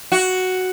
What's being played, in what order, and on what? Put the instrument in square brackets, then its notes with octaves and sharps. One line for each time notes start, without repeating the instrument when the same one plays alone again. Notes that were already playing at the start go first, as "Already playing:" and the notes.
[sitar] F#4